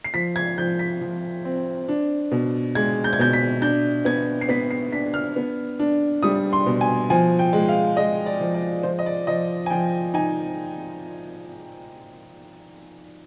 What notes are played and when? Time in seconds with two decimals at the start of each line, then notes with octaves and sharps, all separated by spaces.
0.04 C7
0.14 F3 B6
0.36 G#6
0.58 F3 G6
0.79 B6
1.01 F3
1.45 C4
1.89 D4
2.32 B2
2.75 G#3 G#6
3.04 G6
3.13 G#6
3.19 B2 G6
3.33 B6
3.62 D4 G6
4.05 B3 G#6
4.41 C7
4.49 B3 B6
4.71 C7
4.92 D4 B6
5.14 F6
5.36 B3
5.79 D4
6.23 G3 D#6
6.53 C6
6.66 B2
6.81 G#5
7.10 F3 G#5
7.39 G5
7.53 G#3
7.69 F5
7.96 G#3 D#5
8.26 D5
8.40 F3
8.54 D5
8.83 F3 C5
8.99 D#5
9.06 D5
9.27 F3 D#5
9.66 G#5
9.70 F3 G5
10.14 D#4 G#5